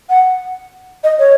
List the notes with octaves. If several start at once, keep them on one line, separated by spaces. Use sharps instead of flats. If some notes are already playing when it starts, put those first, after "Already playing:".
F#5
D#5
C#5